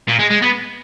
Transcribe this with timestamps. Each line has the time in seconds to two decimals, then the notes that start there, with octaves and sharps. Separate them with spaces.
0.09 A#2
0.20 G#3
0.31 G#3
0.42 B3